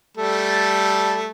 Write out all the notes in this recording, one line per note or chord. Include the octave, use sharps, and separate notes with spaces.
G3 A3 A4